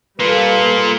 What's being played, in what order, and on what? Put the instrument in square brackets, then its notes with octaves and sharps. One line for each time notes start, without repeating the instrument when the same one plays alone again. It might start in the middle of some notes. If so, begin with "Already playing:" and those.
[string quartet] G3 A4 [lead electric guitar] A#3 F4 [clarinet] B4